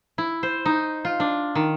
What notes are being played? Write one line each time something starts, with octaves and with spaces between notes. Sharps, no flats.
E4
C5
D#4
F4
D4
D#3